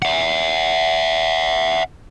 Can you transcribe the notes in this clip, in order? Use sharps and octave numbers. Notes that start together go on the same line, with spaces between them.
E5 F#5